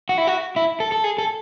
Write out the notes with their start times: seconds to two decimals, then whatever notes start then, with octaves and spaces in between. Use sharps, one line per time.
0.09 F#4
0.18 E4
0.27 F#4
0.56 E4
0.80 A4
0.92 A4
1.04 G#4
1.18 A4